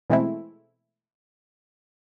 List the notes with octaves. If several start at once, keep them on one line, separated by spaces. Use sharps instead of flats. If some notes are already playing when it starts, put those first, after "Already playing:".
B2 E3 G#3 A3 C4 E4